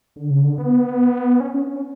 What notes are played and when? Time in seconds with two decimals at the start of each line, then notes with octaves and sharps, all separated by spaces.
0.16 D3
0.30 C#3
0.44 D3
0.58 B3
1.40 C#4
1.54 C#4
1.67 C#4